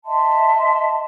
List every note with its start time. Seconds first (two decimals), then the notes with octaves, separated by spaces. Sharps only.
0.04 D#5 E5 A5 C6